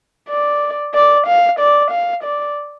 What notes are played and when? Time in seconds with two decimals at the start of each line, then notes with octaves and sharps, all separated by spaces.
0.29 D5
0.94 D5
1.27 F5
1.59 D5
1.91 F5
2.23 D5